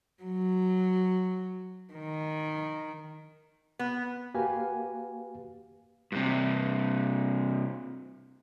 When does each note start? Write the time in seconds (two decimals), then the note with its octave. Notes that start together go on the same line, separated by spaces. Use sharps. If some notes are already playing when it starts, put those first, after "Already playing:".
0.23 F#3
1.93 D#3
3.79 B3
4.34 A#3 F#4 G4 B4 F5 G#5
6.12 G2 C3